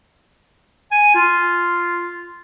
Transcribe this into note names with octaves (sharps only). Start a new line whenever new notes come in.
G#5
F4